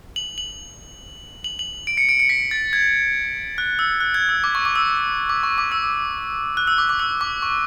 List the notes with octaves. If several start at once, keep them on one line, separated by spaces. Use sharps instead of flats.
F#7
F#7
F#7
F#7
D7
C#7
D7
C#7
B6
A6
G#6
F#6
E6
F#6
G#6
E6
D6
C#6
D6
E6
D6
C#6
D6
E6
F#6
E6
D6
D6
E6
D6
C#6